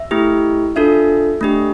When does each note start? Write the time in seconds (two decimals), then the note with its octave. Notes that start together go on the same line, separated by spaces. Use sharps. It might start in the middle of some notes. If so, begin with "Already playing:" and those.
Already playing: E5
0.11 A3 E4 G4
0.76 D4 F4 A4 E5
1.41 A3 D4 G4